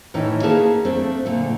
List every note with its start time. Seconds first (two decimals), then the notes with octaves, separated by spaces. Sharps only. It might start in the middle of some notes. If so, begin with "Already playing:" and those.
0.14 A2 D#3 E3 C#4 D#4
0.43 A#3 C#4 G#4 A#4 B4 A5
0.85 A3 C4 D4
1.25 A#2 D3 A3